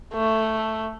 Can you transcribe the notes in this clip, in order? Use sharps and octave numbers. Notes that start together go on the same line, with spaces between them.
A3